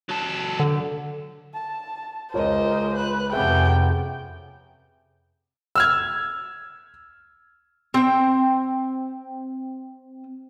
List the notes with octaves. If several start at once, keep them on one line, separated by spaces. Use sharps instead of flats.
F#3 A4
D3
A5
C#2 F4 A#4 C5 C#5 D#5
B4 F#6
F2 C3 B3 C#4 G#4 E5 G5
E6 F6 G#6
C4 G5